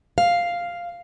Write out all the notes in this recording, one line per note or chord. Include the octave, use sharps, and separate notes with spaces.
F5